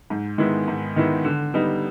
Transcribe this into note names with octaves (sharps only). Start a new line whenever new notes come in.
G#2
D#3 G#3 B3 E4
G#2
D#3 G#3 B3 E4
D3
G3 B3 D#4